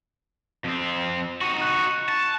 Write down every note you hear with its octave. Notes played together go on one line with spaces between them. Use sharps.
F2 C4
D#4 F#4 C#6 C#7
F#6
A5